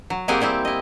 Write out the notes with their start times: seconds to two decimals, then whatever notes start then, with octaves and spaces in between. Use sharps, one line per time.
0.10 F#3
0.28 A#3 C4 G4 G#4 F#5 G#5
0.41 G3 C4 E4 G4
0.65 E4 D#5